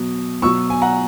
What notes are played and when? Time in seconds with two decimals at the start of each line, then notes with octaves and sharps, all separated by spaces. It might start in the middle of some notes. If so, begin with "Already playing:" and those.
Already playing: B2 F#3
0.42 B2 F#3 C#6 E6
0.70 G#5
0.82 F#5 A#5